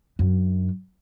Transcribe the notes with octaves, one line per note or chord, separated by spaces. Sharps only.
F#2 D4